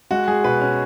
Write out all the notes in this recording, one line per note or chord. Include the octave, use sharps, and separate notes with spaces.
G#3 F#4
G#3 G#4
B2 B4
C#4